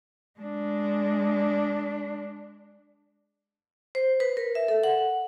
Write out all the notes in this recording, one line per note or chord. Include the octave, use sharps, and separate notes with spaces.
G#3 D4
C5
B4
A#4
E5
A4
F#5